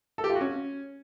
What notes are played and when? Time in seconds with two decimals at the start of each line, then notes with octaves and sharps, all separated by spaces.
0.18 A4
0.24 G4
0.29 F4
0.35 F#4
0.41 C#4